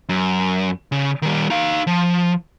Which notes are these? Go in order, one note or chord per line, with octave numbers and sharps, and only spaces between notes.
F#2
C#3
D#3 G3
D#4 F5
F3